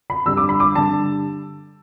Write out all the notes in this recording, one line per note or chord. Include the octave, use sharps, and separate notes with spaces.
B5
G2 D3 G3 E6
D6
B5
D6
G2 D3 G3 A5